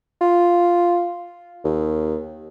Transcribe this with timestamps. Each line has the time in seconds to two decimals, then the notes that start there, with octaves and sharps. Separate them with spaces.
0.21 F4
1.64 D#2